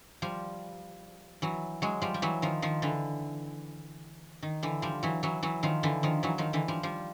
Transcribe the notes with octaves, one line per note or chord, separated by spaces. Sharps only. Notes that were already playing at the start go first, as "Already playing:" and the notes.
F3 G3
E3 F#3
F#3 G#3
F3 G3
G3
E3 F#3
D#3 F3
D#3 F3
D3 E3
D#3
D3 E3
F3 G3
E3 F#3
E3 F#3
E3 F#3
D#3 F3
D3 E3
D#3 F3
E3 F#3
D#3 F3
D3 E3
F3 G3
F3 G3